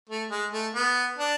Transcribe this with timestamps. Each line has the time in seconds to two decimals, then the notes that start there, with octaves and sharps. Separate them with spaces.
0.10 A3
0.31 G#3
0.53 A3
0.75 B3
1.18 D4